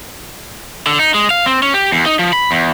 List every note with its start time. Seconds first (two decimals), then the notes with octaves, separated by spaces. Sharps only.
0.87 D3
0.99 D#4
1.14 G#3
1.30 F5
1.46 C4
1.62 C#4
1.74 G4
1.92 E2
2.06 D#4
2.19 F3
2.33 B5
2.51 E2